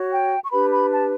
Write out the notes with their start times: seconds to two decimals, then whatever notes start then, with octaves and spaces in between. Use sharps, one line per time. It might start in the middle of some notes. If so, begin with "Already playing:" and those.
Already playing: F#4 C#5
0.10 G5
0.43 C#6
0.50 D4 G4 B4 B5
0.70 B5
0.90 A5